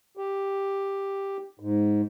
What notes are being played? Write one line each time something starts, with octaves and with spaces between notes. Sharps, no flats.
G4
G#2